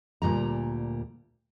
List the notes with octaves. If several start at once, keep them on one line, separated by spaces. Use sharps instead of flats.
D2 A#2 G3 A#5